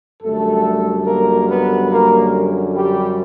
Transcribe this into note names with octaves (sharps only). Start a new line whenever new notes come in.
F#2 D3 G3 A3 A4
A#3 A#4
B3 B4
A#3 A#4
G3 G4